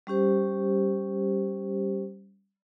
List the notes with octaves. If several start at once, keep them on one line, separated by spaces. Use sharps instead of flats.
G3 C#4 G4 C5